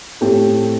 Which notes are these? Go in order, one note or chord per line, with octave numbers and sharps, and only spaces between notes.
A2 A3 C4 G4